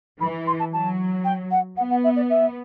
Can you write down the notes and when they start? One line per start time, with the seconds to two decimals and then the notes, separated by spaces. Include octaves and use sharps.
0.19 E3 B5
0.47 C6
0.59 A5
0.72 F#3 A5
1.24 G5
1.51 F#5
1.77 B3 F#5
1.90 F#5
2.04 E5
2.16 D5
2.30 E5